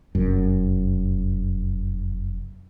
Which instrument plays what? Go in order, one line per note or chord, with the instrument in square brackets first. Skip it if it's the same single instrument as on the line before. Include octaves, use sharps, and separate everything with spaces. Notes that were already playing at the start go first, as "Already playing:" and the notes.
[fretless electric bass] F1 F#2